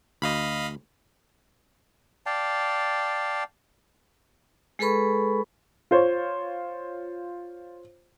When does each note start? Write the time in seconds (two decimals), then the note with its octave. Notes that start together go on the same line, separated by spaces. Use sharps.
0.22 D2 D#5 F5 B5
2.26 D5 F5 G5 A5
4.79 G#3 G#4 A4 B4 B5 C#6
5.91 F4 C5 C#5